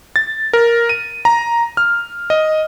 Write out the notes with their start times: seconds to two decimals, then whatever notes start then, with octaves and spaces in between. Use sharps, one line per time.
0.16 A6
0.53 A#4
0.89 D#7
1.25 A#5
1.77 F6
2.30 D#5